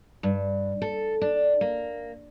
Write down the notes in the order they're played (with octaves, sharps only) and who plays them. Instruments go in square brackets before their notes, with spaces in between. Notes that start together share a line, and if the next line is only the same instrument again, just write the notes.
[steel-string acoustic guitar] G2
A4
D4
A#3